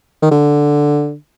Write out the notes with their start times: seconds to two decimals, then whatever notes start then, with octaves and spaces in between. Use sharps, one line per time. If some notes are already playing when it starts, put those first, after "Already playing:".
0.22 D#3
0.31 D3